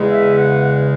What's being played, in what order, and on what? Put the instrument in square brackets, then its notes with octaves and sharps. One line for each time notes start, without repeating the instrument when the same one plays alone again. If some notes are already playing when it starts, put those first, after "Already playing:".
Already playing: [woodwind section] E2 C#3 G#3
E5
F#5